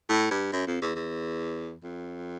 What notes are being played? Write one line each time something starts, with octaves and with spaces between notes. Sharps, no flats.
A2
G2
F#2
F2
E2
E2
F2